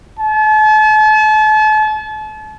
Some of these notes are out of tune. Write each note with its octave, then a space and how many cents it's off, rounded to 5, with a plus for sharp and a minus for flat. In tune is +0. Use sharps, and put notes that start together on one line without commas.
A5 -40